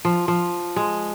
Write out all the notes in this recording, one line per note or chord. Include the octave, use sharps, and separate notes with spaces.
F3
F3
G#3